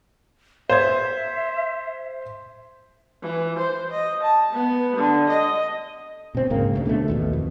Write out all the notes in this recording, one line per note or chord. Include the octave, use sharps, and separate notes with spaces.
C5 E5 G#6
E3
C5
D#5
A5
B3
D3
D#5
B2 C4
C#2 G#2 C#3 A#3
D2 D3 A3
B2 D3 E3 A3
A1 D#2 B2
F2